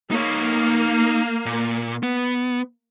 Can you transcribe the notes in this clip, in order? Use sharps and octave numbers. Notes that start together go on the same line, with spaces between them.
A#3 D#4 C#5
A#2
B3